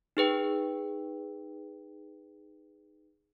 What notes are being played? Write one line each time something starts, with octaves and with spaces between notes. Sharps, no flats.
D#4 G#4 B4 G5